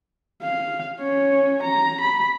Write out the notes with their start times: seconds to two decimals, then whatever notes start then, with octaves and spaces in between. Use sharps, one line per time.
0.43 F5
1.01 C#4 C#5
1.63 A#5
2.01 B5